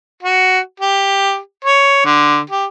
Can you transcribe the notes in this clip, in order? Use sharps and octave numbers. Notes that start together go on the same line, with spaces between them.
F#4
G4
C#5
D3
G4